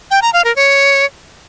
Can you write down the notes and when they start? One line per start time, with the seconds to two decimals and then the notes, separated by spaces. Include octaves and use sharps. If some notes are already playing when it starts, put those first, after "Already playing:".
0.11 G5
0.22 A#5
0.33 F5
0.44 A#4
0.56 C#5